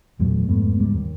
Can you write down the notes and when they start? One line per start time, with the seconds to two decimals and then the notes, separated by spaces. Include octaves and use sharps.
0.19 E2 A#2 F#3 A3
0.48 F2 G#2 A3 B3
0.78 C#2 G#2 G3
0.93 D#2